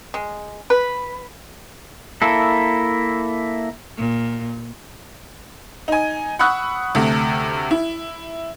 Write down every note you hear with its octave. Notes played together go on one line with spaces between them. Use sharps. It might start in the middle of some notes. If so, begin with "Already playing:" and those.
G#3
B4
A#3 E4 A4
A#2
D#4 G#5
F#5 B5 C#6 D#6 E6 F#6
D2 C3 A3
E4